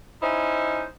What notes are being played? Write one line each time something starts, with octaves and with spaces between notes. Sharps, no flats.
C#4 D#4 E4 C5